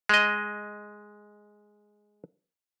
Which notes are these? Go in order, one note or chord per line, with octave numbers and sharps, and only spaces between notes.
G#3 D#5